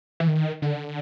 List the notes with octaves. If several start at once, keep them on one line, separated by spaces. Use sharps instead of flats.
E3
D#3
D3